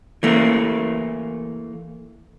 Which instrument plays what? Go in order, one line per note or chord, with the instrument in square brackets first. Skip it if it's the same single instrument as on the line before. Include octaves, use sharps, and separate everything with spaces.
[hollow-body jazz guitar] E3 A3 A#3